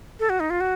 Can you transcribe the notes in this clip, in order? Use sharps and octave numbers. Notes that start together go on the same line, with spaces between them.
A4
F#4
D#4
F4
F#4